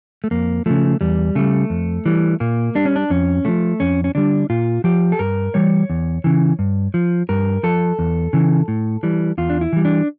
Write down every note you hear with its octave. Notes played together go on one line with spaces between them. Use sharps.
A3
F2 A#3
C#3 F3 A3
E2 G3
C#3 G3 A3
F2
E3 G3
A#2 A#3
G3 D4
C#4
D4
F2 C#4
D3 F3 A3
F2 C#4
C#4
D3 G3 D4
A#2 F4
F3 G4
A4
G2 A#4
E3 G3 C#5
E2
C#3 E3
G2
F3
G2 A#4
F3 A4
E2
C#3 E3
A2
E3 G3
E2 F4
D4
E4
E3 G3
D4